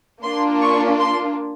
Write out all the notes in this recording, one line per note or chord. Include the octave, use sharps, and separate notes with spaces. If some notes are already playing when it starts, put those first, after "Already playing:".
A#3 D4 F4 C6
C#6
C6